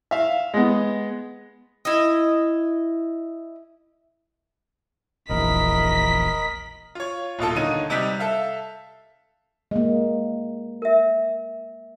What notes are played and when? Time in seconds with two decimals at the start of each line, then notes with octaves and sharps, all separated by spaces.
0.11 E5 F5
0.54 G#3 B3
1.85 E4 D#5
5.29 E1 A#1 E2 A#4 D#5 B5 B6
6.95 F4 C#5
7.39 D#1 B2 F4 A4
7.56 D3 D#3 D#4 C#5 D#7
7.90 C3 G3 D#4 F#6 G6 B6
8.20 A4 E5 F5
9.71 G#3 A#3
10.82 A#4 E5